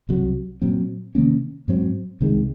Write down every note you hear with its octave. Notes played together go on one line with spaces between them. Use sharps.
C2 C3 F#3
A#2 F#3 C4
C3 D#3 A#3 C#4
G#2 F#3 C4
C2 C3 D#3 G#3